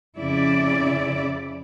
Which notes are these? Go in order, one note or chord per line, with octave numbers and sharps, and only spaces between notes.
F2 C#3 E4 D5